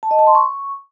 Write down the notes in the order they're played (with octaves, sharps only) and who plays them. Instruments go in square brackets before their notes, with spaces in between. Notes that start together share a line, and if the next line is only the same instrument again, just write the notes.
[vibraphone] A5
D#5
A5
C6
C#6